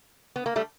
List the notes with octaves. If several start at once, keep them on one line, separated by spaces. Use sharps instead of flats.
B3
A#3
G3 A3